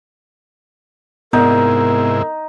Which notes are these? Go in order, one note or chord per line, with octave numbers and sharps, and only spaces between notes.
G#2 C3 B3 D#4 E4 A#4